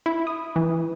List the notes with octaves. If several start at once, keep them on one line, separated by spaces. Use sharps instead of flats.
E4
D#6
E3